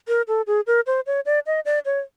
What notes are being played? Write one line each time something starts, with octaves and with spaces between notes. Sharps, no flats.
A#4
A4
G#4
A#4
C5
C#5
D5
D#5
D5
C#5